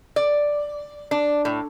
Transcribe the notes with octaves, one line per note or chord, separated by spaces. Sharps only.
D5
D4
A2